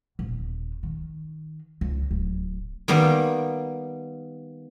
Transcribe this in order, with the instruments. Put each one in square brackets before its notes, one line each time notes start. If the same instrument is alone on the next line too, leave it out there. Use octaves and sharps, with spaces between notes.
[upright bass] D#1
D#3
C#2
D1
[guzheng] D#3 G3 A#3 B3